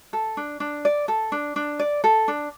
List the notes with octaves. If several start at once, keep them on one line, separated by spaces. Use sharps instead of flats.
A4
D4
D4
D5
A4
D4
D4
D5
A4
D4